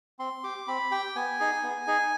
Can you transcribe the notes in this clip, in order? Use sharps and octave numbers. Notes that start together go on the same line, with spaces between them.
C4 C6
G4 D6
C4 B5
G4 G5
B3 G#5
D#4 G#4
B3
D#4 G#4